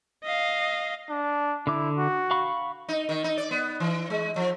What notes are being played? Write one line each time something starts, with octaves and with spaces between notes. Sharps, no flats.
D#5 F5
D4
D3 E4 D6
F#4
F5 B5 C#6
D#4
D#3
D#4
D5
B3
E3
G#3
F3